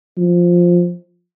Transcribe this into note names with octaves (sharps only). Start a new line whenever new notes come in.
F3